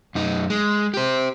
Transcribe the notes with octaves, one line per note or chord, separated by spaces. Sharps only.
F#2 D#4
G#3
G4 C5